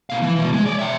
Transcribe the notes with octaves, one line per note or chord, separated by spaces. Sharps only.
B2 F5
E3
B2 E3
G#3
C#5 D5
E5 G5